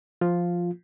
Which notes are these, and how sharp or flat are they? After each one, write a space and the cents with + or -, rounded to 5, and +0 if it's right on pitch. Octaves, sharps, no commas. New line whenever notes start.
F3 +0 F4 +0